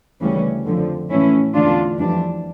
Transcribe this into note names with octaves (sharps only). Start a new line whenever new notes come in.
D2 C#3 E3 G3 C#4
F2 D3 F3
A2 E3 A3 C#4 E4
E2 D3 A3 D4 F4
F2 E3 G3 D4